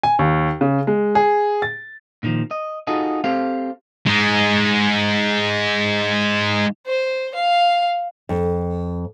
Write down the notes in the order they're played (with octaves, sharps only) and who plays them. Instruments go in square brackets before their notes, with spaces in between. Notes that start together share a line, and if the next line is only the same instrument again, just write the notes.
[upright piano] G#5
D#2
C#3
G#3
G#4
A6
[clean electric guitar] A#2 D3 D#3 F3
D#5
D#4 F4 F#4 G#4 A4 D#5
C4 G4 A4 C5 F5
[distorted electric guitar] G#3 D#4
[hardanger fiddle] C5
F5
[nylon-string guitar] F2